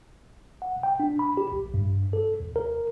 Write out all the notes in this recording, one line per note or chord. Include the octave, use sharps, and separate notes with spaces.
F#5
G5
D4
B5
G4
A#1
G2
A4
D#2
A#4